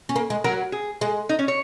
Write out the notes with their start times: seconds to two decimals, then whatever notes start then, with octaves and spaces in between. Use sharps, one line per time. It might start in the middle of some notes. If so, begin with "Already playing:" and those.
0.09 C#4
0.16 A#3
0.30 G#3
0.44 F#3 A#4
0.72 G#4
1.01 G#3
1.29 D#4
1.39 C#4
1.48 C#5